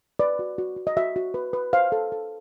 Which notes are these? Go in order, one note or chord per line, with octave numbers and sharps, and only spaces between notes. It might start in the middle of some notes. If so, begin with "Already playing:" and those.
B4 D5
F#4
F#4
F#4
D#5
F#4 E5
F#4
B4
B4
C5 F5
A4
A4